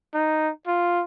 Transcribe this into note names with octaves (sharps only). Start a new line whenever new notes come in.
D#4
F4